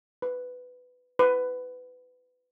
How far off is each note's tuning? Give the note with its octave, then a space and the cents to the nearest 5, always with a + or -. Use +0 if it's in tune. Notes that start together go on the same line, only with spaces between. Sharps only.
B4 +15
B4 +25